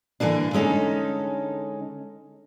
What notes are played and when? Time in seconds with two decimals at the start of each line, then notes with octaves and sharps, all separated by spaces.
0.20 D3 E3 G#3 A#3 D4
0.53 D3 G#3 C#4 D#4 A4